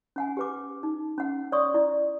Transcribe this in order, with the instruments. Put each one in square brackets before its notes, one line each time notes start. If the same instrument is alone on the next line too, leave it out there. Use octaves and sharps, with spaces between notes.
[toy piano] C#4 F#5 G#5
G4 B4 D6
D#4
C#4 F#5
C#5 D5 C6 C#6 D#6
E4 D5